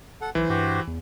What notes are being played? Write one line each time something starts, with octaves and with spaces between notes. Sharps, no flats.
A4 F#5
B1 E3 C5
G2 F#4 G4 C5
E2